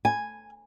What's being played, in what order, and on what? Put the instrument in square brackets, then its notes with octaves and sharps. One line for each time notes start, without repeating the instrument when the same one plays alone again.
[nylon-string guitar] G#5